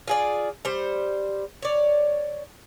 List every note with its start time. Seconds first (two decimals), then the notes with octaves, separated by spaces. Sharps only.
0.07 F4 G#4 D5
0.65 G3 C5
1.62 C#5 D5